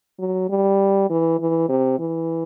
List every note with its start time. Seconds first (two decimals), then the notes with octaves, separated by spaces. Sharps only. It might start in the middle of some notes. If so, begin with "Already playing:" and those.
0.19 F#3
0.49 G3
1.10 E3
1.40 E3
1.69 C3
1.99 E3